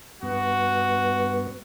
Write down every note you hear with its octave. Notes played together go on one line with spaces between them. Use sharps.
G2 B3 F#4